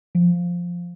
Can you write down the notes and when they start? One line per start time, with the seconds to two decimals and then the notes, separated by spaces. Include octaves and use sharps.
0.15 F3